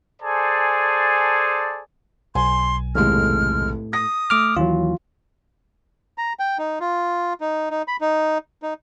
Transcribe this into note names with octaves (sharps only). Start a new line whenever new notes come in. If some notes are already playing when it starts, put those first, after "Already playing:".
G#4 A4 C5 D5 G#5 A5
B1 G#5 C6
F1 D#2 A2 G#3 F6
D#6 A#6
A3 D6 F6
D#2 E3 F#3 F4
A#5
G5
D#4
F4
D#4
D#4
B5
D#4
D#4